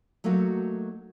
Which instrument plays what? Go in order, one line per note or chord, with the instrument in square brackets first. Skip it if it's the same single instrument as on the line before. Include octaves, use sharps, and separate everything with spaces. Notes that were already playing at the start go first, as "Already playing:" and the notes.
[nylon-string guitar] F#3 A3 A#3 D#4 F#4